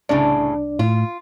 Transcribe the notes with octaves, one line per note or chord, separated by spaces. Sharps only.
C2 A2 C#3 D4 D5
A2 F4